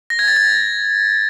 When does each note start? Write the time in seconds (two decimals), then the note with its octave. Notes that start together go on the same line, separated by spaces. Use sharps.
0.10 A#6
0.19 G#6
0.28 A6
0.36 G#6